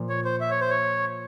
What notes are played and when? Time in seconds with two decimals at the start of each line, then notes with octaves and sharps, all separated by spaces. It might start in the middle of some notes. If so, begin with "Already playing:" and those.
Already playing: A#2 F3
0.09 C#5
0.25 C5
0.41 E5
0.50 C#5
0.61 C5
0.70 C#5